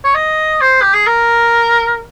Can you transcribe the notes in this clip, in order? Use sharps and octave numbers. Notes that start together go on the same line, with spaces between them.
C#5
D#5
C5
G4
G#4
A#4